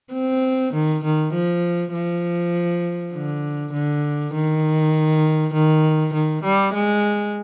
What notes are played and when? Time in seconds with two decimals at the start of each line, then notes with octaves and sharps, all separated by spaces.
0.13 C4
0.74 D#3
1.04 D#3
1.33 F3
1.93 F3
3.14 D3
3.73 D3
4.34 D#3
5.54 D#3
6.14 D#3
6.44 G3
6.74 G#3